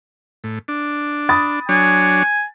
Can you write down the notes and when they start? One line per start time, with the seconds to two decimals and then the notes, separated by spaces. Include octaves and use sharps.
0.44 A2
0.68 D4
1.29 B5 D#6 A6
1.69 F#3 D4 C#5 G#5